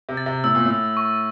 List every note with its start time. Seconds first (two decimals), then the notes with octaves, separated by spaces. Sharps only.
0.09 C3
0.17 A6
0.26 C3
0.44 A2 E6
0.55 A#2
0.66 A2
0.71 E6
0.97 C#6